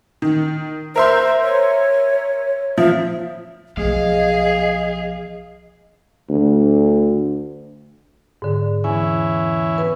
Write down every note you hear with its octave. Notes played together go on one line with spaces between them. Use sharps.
D#3
A#4 C5 E5 C6
C#5
F3 E5
B1 F3 G#4 D#5 F5
D2
G#2 D3
E2 C#4 E4 G#5
B4